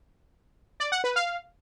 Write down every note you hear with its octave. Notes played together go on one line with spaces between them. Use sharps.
D5
F#5
B4
F5